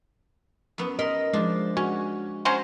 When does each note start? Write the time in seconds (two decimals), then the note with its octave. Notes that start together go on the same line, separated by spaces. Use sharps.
0.78 F#2 B3
0.99 A#4 D#5 B5 C6
1.33 F3 G#3 D4
1.77 C#4 F#4
2.45 F#3 C#4 C5